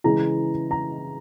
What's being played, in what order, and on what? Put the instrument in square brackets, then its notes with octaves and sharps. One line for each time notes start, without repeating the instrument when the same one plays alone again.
[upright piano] C#3 E3 G#3 A#5
A#5